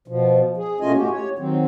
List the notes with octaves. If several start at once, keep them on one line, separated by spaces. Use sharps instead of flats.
B2 F3
G#4
B2 A3 C#4 F4 D#5 G#5
A2 F#4 G4
C#5
D#3 F#3 C4